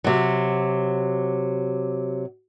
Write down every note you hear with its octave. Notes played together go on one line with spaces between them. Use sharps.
C3 F#3